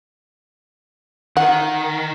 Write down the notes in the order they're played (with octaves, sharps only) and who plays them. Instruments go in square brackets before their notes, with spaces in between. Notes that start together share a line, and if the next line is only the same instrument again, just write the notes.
[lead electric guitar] D#3 [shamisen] F#5